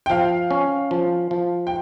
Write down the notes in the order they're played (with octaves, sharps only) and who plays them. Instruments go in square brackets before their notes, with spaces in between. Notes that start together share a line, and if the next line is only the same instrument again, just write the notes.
[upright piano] G5
[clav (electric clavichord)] F3 [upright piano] F5
[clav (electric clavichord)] C#4
F3
F3
[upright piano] G5